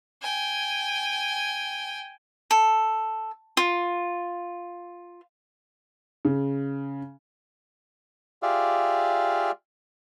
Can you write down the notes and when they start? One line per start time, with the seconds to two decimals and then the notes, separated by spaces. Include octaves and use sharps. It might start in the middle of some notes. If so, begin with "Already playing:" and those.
0.21 G5 G#5
2.51 A4
3.57 F4
6.25 C#3
8.43 F4 G4 G#4 D5 E5 F5